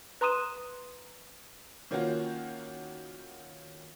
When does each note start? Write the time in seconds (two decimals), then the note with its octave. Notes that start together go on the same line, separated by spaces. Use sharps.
0.21 B4 A#5 C6 D#6 D#7 E7
1.91 D#3 A#3 C#4 F4 F#4